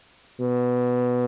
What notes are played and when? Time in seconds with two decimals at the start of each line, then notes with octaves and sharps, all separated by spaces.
0.40 B2